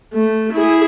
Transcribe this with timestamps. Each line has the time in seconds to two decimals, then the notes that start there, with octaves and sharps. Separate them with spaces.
0.13 A3
0.53 E4 G#4